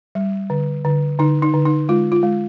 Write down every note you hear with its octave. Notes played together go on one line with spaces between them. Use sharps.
G3
D3
D3
D3 D#4
D#4
D3
D#4
G#3 F4
F4
G#3